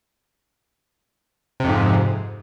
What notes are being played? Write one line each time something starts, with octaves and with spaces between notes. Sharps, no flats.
F2 G#2 C3